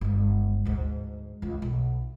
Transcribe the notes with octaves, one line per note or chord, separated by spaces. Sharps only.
G1 G#3
D2 G#2
C#2 F4
B1